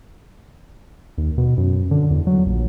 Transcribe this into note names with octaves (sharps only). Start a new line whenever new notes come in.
D#2
B2
F#2
D3
E2
F#3
A#1